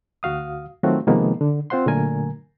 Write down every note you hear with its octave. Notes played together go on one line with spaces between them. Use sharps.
D2 F#4 F5 D#6
D#3 F#3 A3 C4 F4 F#4
C3 D#3 F3 G#3 A#3 B3
D3
C4 F4 C5 F#5 C6
A#2 D3 F#3 A3 A#4 G#5